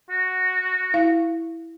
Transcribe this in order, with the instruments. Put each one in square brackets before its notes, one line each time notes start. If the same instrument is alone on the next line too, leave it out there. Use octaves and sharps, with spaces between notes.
[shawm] F#4
[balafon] E4 F5